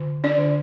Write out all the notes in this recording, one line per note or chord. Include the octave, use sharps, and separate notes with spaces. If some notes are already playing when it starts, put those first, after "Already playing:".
Already playing: D3
D4 D5
D3